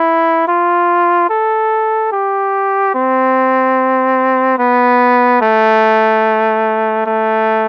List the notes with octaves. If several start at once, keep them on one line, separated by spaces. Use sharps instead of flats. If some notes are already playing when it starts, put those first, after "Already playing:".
Already playing: E4
F4
A4
G4
C4
B3
A3
A3